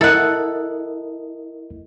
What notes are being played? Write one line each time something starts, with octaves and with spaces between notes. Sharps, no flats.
E4 A4 A#4 D#5 F#5